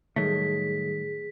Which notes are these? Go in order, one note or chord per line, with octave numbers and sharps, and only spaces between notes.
A2 D#3 F#3 G3 A3 G#4 B6